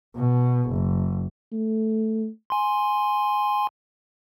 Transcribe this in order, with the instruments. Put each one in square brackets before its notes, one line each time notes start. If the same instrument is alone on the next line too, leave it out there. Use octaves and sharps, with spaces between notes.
[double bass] B2
F#1
[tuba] A3
[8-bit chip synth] G#5 C6